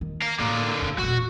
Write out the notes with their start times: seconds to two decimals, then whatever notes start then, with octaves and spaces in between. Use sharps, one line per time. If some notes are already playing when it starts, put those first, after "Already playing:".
0.01 D#3
0.22 F5 A#5
0.39 A2 D3 A#3
0.81 F2 C#3
0.98 E1 A#2 F#4